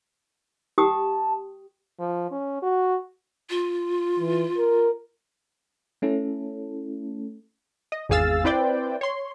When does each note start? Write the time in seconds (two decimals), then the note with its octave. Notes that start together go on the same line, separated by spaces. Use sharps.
0.78 G4 G5 A5 D#6
2.00 F3
2.31 C#4
2.63 F#4
3.50 F4
4.20 E3
4.58 A#4
6.02 A3 C#4 E4 A4
7.92 D#5
8.09 G#1 E2 G#4 F5 E6 A6
8.44 C4 E4 B4 C5 D5 G5
9.01 C#5 C6